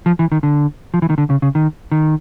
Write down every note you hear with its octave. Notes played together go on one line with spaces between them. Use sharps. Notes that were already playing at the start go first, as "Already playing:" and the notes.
F3
E3
D#3
D3
F3
E3
D#3
D3
C#3
C#3
D#3
D#3